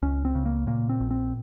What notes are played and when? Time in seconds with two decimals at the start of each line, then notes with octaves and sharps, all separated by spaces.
0.02 C#2 C#4
0.25 C4
0.35 C#3
0.45 A#3
0.67 A#2 A#3
0.89 C4
1.00 A#1
1.11 C4